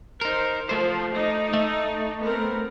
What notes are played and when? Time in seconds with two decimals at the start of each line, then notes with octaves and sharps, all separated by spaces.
0.21 D#4 A#4 C5
0.69 F3 A3 C5
1.12 D#4 D5
1.53 A3
2.21 B3 C4 A#4